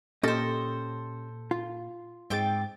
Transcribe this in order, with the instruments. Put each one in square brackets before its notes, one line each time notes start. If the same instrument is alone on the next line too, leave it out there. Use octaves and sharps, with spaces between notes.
[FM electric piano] A#2 [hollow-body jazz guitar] C#4 G4 D#5 [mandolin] A4 C5
[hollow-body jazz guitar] F4
[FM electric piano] G#2 G#3 A6 [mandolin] C4 G5 D6